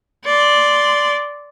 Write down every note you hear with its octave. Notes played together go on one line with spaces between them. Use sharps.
D5 C6